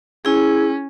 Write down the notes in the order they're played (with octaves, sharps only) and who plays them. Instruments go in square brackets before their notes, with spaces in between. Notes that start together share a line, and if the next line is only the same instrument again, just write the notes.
[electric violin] C#4 [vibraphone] E4 G#4